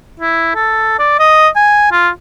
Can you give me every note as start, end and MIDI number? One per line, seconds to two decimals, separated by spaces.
0.20 0.52 64
0.55 0.98 69
0.99 1.18 74
1.19 1.48 75
1.56 1.91 80
1.92 2.09 65